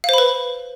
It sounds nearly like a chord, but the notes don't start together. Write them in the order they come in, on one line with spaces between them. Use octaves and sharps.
F5 C5 B5 B4